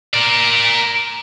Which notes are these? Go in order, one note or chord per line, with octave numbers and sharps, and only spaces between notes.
A#4 D5